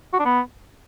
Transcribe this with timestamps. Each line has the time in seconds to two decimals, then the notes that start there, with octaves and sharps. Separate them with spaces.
0.13 F#4
0.19 D4
0.25 B3